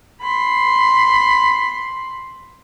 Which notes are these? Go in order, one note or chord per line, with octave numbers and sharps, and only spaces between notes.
B5 C6